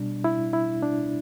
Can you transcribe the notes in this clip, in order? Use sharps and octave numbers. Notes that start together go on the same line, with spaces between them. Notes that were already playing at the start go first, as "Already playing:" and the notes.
Already playing: B2 G3 D4
E4
E4
D4